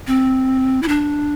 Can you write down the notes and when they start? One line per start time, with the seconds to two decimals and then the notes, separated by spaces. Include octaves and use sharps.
0.07 C4
0.82 E4
0.88 D4